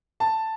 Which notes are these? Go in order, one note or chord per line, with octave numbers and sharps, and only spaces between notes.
A5